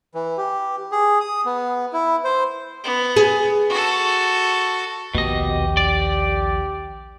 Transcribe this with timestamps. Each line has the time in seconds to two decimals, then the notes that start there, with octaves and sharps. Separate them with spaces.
0.15 E3
0.37 G4
0.92 G#4
1.21 D#6
1.46 B3
1.93 E4
2.24 C5
2.84 B3
3.16 G#4
3.70 F#4 A4
5.15 A#1 D#2 B2 G4 D#5
5.77 D5